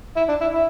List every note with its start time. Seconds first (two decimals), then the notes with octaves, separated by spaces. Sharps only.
0.17 E4
0.29 D4
0.41 E4
0.54 E4